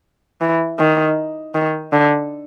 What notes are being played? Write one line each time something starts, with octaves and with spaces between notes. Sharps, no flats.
E3
D#3
D#3
D3